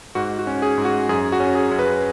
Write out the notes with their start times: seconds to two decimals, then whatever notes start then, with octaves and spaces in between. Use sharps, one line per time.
0.15 G#2 F#4
0.39 F#4
0.47 C#4
0.62 G#4
0.78 G#2
0.85 F#4
1.09 F#2 G#4
1.32 F#4
1.40 C#4
1.55 G#4
1.71 F#2
1.79 B4